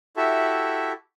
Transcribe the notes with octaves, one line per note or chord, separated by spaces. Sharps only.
E4 F#4 G4 A4 E5